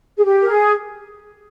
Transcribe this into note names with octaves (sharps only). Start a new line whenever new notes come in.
G#4
G4
A#4
G#4